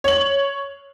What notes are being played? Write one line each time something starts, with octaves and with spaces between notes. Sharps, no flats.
C#5 F#7